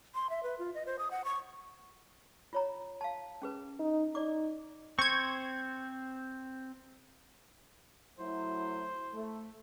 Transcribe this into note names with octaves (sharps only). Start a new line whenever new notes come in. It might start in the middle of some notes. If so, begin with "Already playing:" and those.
C6
E5
B4
F4
D#5
C5
D#6
F#5
C#6
F4 C#5 A#5
F5 A5
C#4 G#4 B4
D#4
D#4 D5 D6
C4 C5 C#6 G#6
F#3 A3 E4 C5
A3